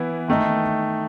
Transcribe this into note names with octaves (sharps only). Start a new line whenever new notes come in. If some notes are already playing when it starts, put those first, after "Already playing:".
Already playing: E3 B3 E4
D#3 A3 D#4